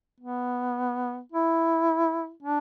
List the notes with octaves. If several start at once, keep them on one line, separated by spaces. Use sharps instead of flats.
B3
E4
D4